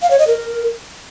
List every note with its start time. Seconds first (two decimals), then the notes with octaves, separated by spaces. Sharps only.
0.02 F5
0.11 C#5
0.19 D#5
0.27 A#4